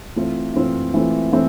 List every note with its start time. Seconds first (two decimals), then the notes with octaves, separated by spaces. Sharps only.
0.16 E3 A3 C4 F4
0.54 E3 A3 C4 F4
0.94 E3 A3 C4 F4
1.32 E3 A3 C4